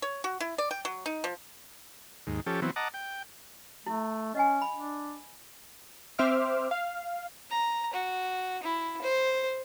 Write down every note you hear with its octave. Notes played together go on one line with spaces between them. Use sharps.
C#5
F#4
E4
D5
G5
F#3
D#4
F3
D#2 G#2
F3 C#4 G4 A4
E3 F#3 B3 C4
D#5 F#5 A5 A#5 D6
G5
A3 E4
C#4 D#5 F#5 G#5
B5
D4
C4 C5 E5 D6 F6
F5
A#5
F#4
E4
C5